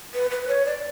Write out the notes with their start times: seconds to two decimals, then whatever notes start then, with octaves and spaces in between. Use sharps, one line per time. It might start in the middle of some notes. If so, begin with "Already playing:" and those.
0.14 B4
0.31 B4
0.48 C#5
0.65 D5